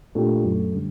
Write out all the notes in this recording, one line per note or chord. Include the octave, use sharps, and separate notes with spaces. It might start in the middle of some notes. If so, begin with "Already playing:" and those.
A#2 A3 D4 G4
F#2 F#3 A3
D3 G3